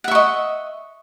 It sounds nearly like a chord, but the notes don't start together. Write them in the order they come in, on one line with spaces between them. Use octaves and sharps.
F#5 E5 C#6 D#5